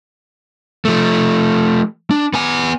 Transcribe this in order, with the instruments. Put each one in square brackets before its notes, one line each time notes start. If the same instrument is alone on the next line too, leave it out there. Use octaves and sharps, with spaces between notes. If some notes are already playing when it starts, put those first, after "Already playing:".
[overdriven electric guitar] F3 A3
D4
B3 G#5